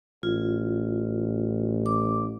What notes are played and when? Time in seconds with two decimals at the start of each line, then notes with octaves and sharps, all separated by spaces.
0.23 A1 F4
1.86 D6